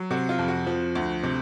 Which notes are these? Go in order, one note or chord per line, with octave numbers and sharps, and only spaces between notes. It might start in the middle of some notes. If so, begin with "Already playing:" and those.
Already playing: F#3
C3 F#4
F4
F2
F#4
F3
D2
C3